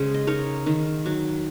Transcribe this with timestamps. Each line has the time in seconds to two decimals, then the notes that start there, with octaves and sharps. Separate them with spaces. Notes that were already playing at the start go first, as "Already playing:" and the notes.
Already playing: C#3 G#3 G#4 C5
0.14 D#5
0.27 D#4 A#4 C#5
0.66 D#3
1.06 F#3